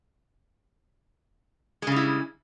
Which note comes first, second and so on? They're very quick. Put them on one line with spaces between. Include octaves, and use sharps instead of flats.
G#3 C#3 G3 E4